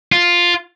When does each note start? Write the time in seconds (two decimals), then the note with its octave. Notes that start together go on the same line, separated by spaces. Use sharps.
0.12 F4